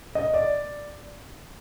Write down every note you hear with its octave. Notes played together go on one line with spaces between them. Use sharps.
D#5
D5